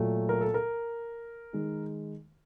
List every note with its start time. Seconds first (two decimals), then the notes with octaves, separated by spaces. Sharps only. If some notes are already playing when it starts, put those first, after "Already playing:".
Already playing: A#2 F#3 A3
0.29 A#4
0.41 A4
0.54 A#4
1.53 D#3 G#3